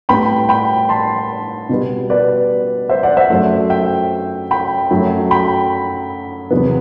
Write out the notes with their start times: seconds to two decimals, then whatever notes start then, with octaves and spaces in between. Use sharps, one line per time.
0.09 A2 G3 B3 G5 B5
0.49 G5 B5
0.89 A5 C6
1.69 B2 G3 B3
2.10 B4 D5
2.89 C5 E5
3.03 D5 F#5
3.17 C5 E5
3.30 F#2 F#3 A3
3.70 E5 G5
4.51 G5 B5
4.91 F#2 F#3 A3
5.31 G5 B5
6.51 E2 C3 F#3 B3